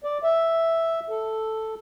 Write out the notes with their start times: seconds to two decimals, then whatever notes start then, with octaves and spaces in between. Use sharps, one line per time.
0.04 D5
0.23 E5
1.10 A4